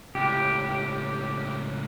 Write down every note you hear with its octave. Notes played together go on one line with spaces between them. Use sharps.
C#2 A2 G4